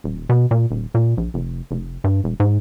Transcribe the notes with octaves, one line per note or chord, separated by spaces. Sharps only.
D#1
B2
A#2
D#1
A#2
A#1
F1
F1
G2
E1
G#2